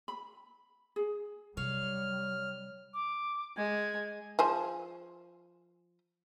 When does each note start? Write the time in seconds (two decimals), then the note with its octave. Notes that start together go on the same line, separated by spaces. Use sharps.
0.08 B5
0.96 G#4
1.57 C3 F#3 G3 C#5 F5 F6
2.93 D6
3.57 G#3 G#6
4.39 F3 G#4 C5